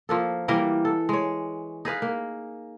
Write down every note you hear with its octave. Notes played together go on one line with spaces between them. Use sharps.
F3 A#3 A4
E3 G3 A#3 A#4
A4
G#3 C#5
D#4 G#4 B4 F5
A#3